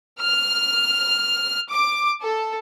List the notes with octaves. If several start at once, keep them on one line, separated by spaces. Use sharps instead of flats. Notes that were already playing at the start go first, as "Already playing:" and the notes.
F6
D6
A4